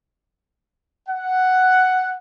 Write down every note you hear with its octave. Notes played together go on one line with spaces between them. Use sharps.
F#5